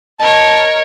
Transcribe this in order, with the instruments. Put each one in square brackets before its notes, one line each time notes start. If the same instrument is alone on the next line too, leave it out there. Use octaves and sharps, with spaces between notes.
[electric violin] A#4 C#5 [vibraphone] D#5 [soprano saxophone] A5